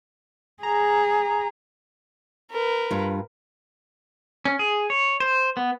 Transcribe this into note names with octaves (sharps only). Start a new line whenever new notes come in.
G#4 A#5
A#4 B4
G2 F4
C#4
G#4
C#5
C5
B3